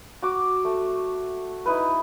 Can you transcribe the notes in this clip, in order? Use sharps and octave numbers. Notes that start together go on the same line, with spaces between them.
F#4 D6
A3
D#4 E4 B4